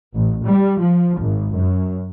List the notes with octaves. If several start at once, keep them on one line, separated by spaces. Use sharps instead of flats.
A1
G3
F3
G#1
F#2